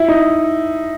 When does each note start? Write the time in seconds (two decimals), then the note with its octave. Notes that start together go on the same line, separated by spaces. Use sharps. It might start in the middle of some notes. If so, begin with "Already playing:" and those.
Already playing: E4
0.08 D#4